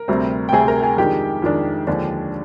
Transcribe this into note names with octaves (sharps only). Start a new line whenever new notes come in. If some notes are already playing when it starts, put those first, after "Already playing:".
Already playing: A#4
D2 C3 G3 C4
G5
D2 C3 G3 C4 G#4 G#5
A#4 A#5
G#4 G#5
F2 D#3 G#3 D4 G4 G5
F2 D#3 G#3 D4
D#2 D3 F3 G#3 D4